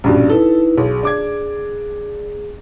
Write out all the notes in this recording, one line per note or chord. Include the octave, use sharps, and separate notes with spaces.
A#1 G2 B2 C#4 D4 D5
D#4 E4 A4 B4
B1 G#4
D4 D6 G#6